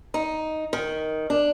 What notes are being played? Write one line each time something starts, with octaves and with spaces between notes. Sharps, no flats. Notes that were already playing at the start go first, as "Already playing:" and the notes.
D#4
D#3
D4